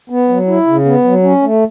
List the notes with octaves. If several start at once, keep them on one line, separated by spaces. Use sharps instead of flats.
B3
F#3
E4
C#3
B3
F#3
C#4
A3